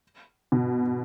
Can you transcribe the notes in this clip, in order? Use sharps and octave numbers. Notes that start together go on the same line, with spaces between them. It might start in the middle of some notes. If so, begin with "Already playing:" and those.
B2